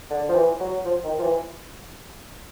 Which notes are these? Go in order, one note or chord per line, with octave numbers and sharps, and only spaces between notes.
D3
F3
E3
F#3
F3
D#3
F3
E3